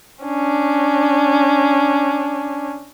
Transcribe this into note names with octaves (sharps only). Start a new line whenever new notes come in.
C#4 D4